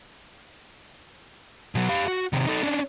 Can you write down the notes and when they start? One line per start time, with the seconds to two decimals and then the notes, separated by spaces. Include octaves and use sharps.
1.75 B2 F#3
1.89 G4 F5
2.08 F#4
2.33 C3 D#3
2.47 D#4 A4
2.63 C#4 D4